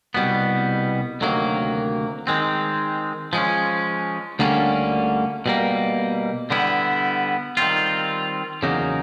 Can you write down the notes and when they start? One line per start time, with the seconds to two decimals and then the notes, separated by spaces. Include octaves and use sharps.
0.14 C2 B2 G3 B3
1.21 D2 C3 D#3 F#3 A#3
2.27 D#3 G#3 C4
3.33 F3 G#3 C#4
4.39 D2 D3 G3 A#3 C#4
5.46 B2 G3 A#3
6.51 D3 G3 B3 E4
7.57 D#3 G3 C4 F4
8.63 E2 C#3 F#3 A#3 D#4